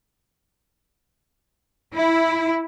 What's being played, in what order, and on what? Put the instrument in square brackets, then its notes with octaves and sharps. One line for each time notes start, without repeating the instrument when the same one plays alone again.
[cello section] E4